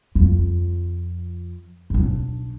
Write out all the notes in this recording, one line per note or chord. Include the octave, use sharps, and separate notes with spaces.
F2 F3
B1 D4